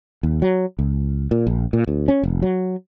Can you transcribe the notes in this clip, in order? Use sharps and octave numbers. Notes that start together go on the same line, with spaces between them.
D#2
F#3
C#2
A#2
A#1
A#2
D2
C#4
F1
F#3